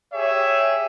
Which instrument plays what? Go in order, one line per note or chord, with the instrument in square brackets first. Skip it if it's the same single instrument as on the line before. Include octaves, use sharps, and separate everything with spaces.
[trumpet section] G4 G#4 C#5 E5